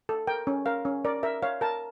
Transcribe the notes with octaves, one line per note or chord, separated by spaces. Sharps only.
A4
A#4 G5
C#4
A#4 F5
C#4
A#4 D5
A#4 E5
C#5 F5
A#4 A5